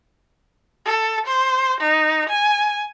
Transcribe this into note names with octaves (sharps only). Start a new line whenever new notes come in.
A4
C5
D#4
G#5